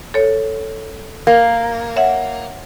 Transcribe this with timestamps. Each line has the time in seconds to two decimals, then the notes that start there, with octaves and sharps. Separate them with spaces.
0.14 A4 C#5
1.27 A#3
1.96 C#5 E5 F#5